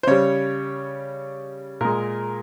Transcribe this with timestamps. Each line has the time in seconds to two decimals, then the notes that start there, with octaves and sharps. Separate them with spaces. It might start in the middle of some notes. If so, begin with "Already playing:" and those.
0.03 C5
0.07 C#3 G3 C#5
1.81 A#2 G#3 A#4